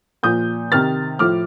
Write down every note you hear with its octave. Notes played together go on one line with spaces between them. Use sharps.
A#2 F3 D#6 G6
C3 D#3 F6 A6
A2 F3 D6 F6